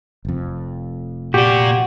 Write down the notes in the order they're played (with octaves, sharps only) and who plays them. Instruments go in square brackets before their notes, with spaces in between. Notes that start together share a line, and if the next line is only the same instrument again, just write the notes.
[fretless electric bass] F1 F2
[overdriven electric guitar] A#2 D5 [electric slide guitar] F#4 [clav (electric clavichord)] G4